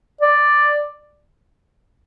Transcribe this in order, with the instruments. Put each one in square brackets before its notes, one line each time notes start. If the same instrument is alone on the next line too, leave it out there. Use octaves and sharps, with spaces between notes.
[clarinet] D5